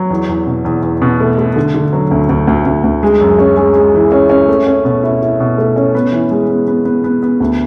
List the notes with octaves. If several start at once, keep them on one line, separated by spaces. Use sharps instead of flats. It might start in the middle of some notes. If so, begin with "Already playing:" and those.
Already playing: F#3
E2
E2
B2
E2
E2
B2
A3
A3
D3
D3
F#3
D2
D2
D2
D2
D2
G#3
F#2
C#4
G#3
G#3
E3
C#4
C#4
A3
C#4
B2
E4
E4
B2
A3
C#4
B3
E3
G#3
B3
B3
B3
B3
B3
D2